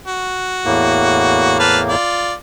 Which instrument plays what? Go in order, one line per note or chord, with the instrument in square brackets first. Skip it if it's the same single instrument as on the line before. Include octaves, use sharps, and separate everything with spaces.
[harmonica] F#4
[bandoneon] E2 A2 A#3
[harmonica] B4 F5 A5
F4 D5